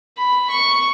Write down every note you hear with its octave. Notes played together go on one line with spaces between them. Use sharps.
B5
C#6